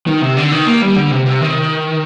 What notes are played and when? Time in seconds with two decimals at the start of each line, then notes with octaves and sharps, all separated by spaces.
0.07 D#3
0.22 C3
0.37 D3
0.52 D#3
0.66 A#3
0.82 G3
0.96 D3
1.11 C3
1.26 C3
1.41 D#3